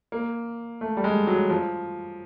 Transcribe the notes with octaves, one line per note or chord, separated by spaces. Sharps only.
A#3
A3
G3
G#3
F#3
F3